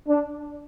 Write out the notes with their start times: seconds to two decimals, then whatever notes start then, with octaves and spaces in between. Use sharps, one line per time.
0.08 D4